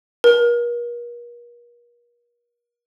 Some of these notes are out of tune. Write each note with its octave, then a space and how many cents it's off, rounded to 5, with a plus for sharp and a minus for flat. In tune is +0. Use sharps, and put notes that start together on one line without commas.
A#4 +40